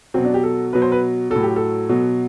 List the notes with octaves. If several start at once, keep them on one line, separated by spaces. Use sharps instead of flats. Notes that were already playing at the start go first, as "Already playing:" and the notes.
B2 F#3 C4
D4
G4
A4
B2 F#3 B4
C5
B4
A2 F#3 A4
G4
A4
B2 F#3